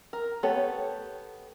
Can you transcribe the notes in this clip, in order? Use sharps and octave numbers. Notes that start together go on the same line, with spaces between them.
A#4
A3 B3 G4 A4 C#5